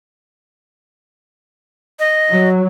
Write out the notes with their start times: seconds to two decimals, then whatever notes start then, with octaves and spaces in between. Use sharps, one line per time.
1.99 D#5
2.30 F#3